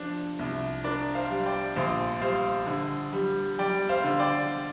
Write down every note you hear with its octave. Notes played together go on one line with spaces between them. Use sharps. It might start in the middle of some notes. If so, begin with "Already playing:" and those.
Already playing: F3 D4
C2
D4 A#4 D5
C5 F5
G3
D5 G5
A#1 C5 F5
G3 C5 F5
D3
G3
G3 D5 G5
C5 F5
D3
D5 G5